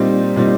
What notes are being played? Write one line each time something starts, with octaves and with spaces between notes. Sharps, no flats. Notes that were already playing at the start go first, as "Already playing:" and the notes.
Already playing: A#2 G3 C4 D#4
A#2 G3 C4 D#4